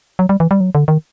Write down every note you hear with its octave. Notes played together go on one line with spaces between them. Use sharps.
F#3
G3
E3
G3
F#3
D3
D#3